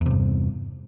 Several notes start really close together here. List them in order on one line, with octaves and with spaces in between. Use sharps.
E2 C3 G2